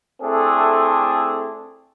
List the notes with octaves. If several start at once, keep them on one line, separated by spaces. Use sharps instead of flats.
A3 C4 D4 E4 G#4 A4